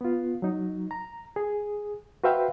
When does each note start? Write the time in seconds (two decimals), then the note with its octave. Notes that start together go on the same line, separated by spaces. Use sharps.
0.01 B3 F4
0.42 F#3 D#4
0.91 A#5
1.36 G#4
2.24 F#4 B4 C5 E5 F5 G5